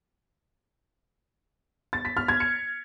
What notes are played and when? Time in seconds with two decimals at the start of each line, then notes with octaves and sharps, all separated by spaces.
1.93 A6
2.05 B6
2.17 F6
2.28 G#6
2.40 C#7